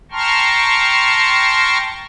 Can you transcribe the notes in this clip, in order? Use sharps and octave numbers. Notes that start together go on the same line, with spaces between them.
G5 A5 A#5 C6 C#6 F6